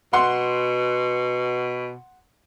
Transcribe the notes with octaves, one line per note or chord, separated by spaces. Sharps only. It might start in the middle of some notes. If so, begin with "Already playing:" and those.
B2 F#5 C6